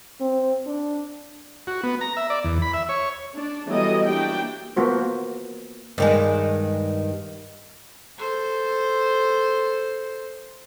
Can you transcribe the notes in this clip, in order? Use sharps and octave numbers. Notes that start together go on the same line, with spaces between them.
C4
D4
F#4
B3
A#5
E5
D5
E2
B5
E5
C#5
D4
E3 F#3 G3 B3 A4 D#5
A#3 D4 E4 F#4 G4 G5
A#3 B3 F4 F#4 C5
G2 D#3 G#3
A4 C5